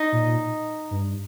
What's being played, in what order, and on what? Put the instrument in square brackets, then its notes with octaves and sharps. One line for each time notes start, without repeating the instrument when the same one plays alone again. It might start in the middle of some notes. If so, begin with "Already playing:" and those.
Already playing: [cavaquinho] D#4 D#5
[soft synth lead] A#2
G2